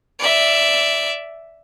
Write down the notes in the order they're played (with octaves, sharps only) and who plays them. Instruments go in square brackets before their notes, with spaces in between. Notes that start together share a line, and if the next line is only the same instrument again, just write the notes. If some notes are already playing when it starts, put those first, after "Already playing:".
[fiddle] D5 E5